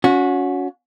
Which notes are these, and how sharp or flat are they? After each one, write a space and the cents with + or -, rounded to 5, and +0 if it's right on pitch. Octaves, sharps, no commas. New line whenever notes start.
C#4 +20 F#4 -20